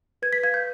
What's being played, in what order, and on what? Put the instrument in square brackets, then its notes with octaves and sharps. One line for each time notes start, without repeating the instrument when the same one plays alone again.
[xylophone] B4 G#6
B6
F5 G#6
G6